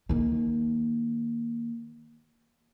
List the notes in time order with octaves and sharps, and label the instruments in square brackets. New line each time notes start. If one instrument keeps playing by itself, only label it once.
[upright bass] D#3 A#3